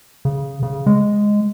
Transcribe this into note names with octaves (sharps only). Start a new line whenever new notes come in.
C#3
C#3
G#3